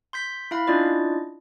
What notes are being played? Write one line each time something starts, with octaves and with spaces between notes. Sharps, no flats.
C6 G6 B6
E4 F5 B5
C#4 D4 E4 F4 D5 D#5